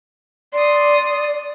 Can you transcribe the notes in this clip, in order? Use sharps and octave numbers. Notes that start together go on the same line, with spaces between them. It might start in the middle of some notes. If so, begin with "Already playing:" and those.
D5 C6 D#6